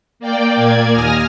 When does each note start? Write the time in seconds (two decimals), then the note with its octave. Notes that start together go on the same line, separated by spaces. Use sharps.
0.20 A#3 D5 G5
0.56 A#2 A#3 D5 G#6
0.92 D#2 G#5 D#6 F6 A#6